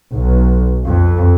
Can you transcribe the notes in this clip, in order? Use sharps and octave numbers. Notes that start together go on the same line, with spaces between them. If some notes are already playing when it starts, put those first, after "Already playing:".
B1
F2